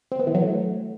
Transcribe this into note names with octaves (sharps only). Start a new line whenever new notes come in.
C4
B3
E3
F#3
A3